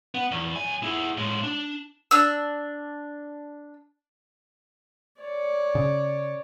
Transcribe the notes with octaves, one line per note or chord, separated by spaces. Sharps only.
B3
E2
B1 G#5
E4 G#4
A2 G#3
D4
D4 E6
C#5 D5
C#3